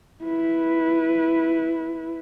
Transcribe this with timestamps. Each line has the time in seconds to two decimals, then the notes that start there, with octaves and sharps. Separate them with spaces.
0.23 E4 B4